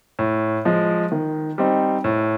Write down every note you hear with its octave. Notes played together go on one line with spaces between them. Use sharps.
A2
F3 G#3
D#3
G3 C4 D#4
A2